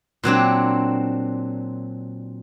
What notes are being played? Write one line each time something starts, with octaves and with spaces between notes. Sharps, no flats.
A#2 F#3 C4 D4